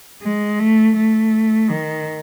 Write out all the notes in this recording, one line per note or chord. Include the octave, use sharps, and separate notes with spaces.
G#3
A3
A3
D#3